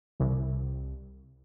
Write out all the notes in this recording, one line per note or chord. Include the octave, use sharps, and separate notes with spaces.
C2